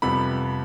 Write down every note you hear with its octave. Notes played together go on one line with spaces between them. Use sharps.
F2 C3 G3 B3 B5